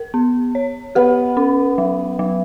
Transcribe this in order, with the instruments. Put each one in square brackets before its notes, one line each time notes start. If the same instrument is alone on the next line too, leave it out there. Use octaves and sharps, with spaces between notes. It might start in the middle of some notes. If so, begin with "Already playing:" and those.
Already playing: [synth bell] A#4
B3
C#5
[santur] B3 [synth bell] G4
[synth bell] C#4
F#3
F#3